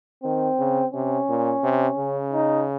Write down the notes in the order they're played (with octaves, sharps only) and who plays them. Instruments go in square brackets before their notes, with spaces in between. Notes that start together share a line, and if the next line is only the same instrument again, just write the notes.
[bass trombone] D#3 [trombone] C4
[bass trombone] C#3
[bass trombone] C3 [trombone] C#4
[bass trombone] A#2
C3
C#3
[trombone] D#4